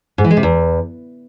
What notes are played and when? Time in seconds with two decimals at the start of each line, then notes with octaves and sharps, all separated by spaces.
0.18 G#2
0.24 E3
0.31 G#3
0.37 C3
0.43 E2